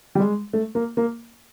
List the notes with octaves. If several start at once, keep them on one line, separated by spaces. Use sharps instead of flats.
G3
G#3
A3
A#3
A#3